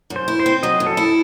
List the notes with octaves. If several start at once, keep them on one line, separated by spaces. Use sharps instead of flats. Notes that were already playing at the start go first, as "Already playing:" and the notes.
F#2
C5
E4
C5
C4
F#3 D#5
F#2
A4
E4